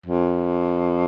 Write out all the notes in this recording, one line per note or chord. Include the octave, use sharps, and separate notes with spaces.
F2